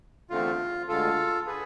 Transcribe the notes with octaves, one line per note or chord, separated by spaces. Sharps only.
E2 D3 A3 C4 F4
D2 D3 G#3 F4 A4
D3 G#4 B4